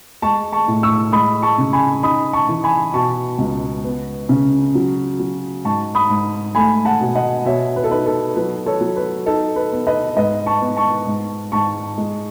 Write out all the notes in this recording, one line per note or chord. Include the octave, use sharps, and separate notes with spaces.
G#3 A5 C#6
A5 C#6
A2
C#6 E6
G#3 B5 D#6
A5 C#6
C#3
G#5 B5
D#4 B5 D#6
A5 C#6
E3
G#5 B5
B2 A5 C#6
C#2
B3
C#3
F#3
F#3
G#2 A5 C#6
B5 D#6
G#2
A3 G#5 B5
F#5 A5
B2
D#5 F#5
B2 C#5 E5
B4
A4
D#4 B4
A4
F#3 B4
A4 C#5
F#3
B4
D#4 A4
B4
B3
B4 D#5
G#2 B4 D#5
A5 C#6
B3
A5 C#6
G#2
G#2 A5 C#6
G#3